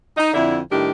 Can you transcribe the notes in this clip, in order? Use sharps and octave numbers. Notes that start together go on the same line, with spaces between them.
D#4
F2 D3 E4
A2 D#3 G3 D4 G4